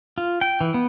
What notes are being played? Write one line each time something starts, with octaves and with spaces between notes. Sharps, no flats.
F4
G5
E3
B3